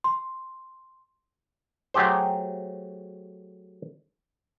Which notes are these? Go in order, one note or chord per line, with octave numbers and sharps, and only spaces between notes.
C6
F#3 A3 G4 G#4 C5